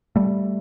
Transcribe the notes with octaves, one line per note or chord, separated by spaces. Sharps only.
G3 A3